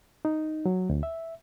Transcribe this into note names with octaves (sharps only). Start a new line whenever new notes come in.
D#4
F#3
D2
E5